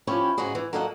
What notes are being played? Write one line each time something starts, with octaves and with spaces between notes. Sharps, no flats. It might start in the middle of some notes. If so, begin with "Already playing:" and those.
F3 C#4 E4 G4 C#5
G#2 C#3 G#3 F#4 G#4
E3
F#3 A#3 A4 D#5 F5 F#5